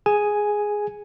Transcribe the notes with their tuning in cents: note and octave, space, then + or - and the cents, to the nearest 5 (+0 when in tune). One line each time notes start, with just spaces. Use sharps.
G#4 +0 G#5 +0